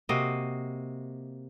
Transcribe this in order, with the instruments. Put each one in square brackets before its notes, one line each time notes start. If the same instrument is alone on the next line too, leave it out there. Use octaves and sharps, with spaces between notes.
[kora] C3 A#3 F#4 D#5